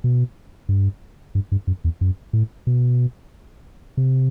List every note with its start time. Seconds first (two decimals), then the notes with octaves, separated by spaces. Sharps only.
0.04 B2
0.69 G2
1.35 G2
1.52 G2
1.67 F#2
1.84 E2
2.01 F#2
2.33 A2
2.67 B2
3.97 C3